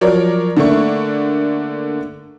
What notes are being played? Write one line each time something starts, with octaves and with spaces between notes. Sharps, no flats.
F3 F#3 A#4 C#5 D5
D3 A3 A#3 D4 C#6